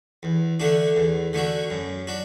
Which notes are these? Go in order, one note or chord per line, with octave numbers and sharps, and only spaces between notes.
E2
D3 A3 D4 F#4
E2
D3 A3 D4 F#4
F#2
D4 F#4